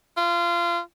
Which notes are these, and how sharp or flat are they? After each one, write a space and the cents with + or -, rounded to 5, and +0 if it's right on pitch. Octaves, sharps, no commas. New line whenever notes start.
F4 -25